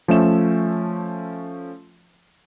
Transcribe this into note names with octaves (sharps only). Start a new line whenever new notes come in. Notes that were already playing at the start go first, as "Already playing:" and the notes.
F3 A3 C#4 E5 E7